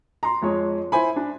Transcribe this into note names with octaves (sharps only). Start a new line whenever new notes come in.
A#5 C6
F2 G#3 C#5
E4 C5 G#5 B5
D4